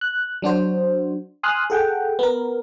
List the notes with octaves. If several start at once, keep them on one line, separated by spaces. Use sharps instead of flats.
F#6
F#3 D4 F#4 C5
G#5 C6 D#6 F6 F#6
G#4 A4 F#5 G5
B3 A#4